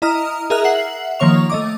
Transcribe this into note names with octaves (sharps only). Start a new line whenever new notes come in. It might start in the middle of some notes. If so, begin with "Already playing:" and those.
E4 D#5 A#5 D#6 F6
G#4 A#4 E5 A#5 F6 F#6
E5 F#5 C7 F#7
D#3 F3 A#3 C#5 C#6 F7
A3 D#5 D6